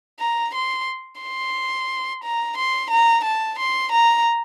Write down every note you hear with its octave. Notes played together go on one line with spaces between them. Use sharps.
A#5
C6
C6
A#5
C6
A#5
A5
C6
A#5